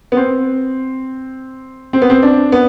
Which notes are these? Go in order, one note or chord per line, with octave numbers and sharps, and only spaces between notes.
B3
C4
C4
B3
C4
D4
B3